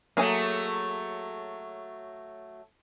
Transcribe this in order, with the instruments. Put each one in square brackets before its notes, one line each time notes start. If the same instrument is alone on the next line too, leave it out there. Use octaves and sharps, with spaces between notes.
[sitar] F#3 A3 [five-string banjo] A#3 G#4 G#5